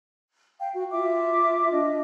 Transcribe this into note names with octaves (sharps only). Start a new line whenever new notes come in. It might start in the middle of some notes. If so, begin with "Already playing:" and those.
F5 G5
F#4
F4 E5 D6
D4 D#5